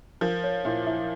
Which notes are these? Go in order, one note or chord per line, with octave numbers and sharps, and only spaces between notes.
F3 A#4
C#5
A#2 E4 E5
E4 E5